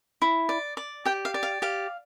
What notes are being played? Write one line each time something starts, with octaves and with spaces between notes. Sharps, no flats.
E4
D5
D5
G4 G5
F5
D5
F5
G4 F5